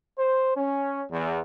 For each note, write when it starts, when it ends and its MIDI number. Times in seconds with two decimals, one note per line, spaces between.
0.18 0.52 72
0.56 1.03 61
1.11 1.40 40